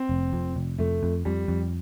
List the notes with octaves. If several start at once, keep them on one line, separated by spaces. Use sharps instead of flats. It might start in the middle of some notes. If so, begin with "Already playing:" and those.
Already playing: C4
F1
F2
F1
F2 A3
F2
F2 G3
F2